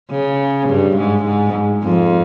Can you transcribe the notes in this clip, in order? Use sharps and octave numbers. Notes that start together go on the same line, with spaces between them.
C#3
G2
G#2
G#2
F2